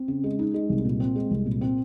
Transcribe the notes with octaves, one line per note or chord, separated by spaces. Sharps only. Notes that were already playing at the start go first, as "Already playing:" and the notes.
Already playing: C4
C#3
G#3
D#4
G#3
C2
A#2
C4
G#3
C2
A#2
C4